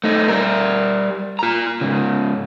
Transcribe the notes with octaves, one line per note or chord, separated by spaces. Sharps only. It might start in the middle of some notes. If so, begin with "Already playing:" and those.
A3 D#4
G3 A#4
F4 A#5
G#2 C#3